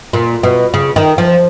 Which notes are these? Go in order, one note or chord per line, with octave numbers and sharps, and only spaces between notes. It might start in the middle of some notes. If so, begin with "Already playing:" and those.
A#2
B2
C#3
D#3
F3